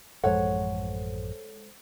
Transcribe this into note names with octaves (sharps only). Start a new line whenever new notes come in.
A1 F#2 F3 G#3 A4 C5 C#5 F#5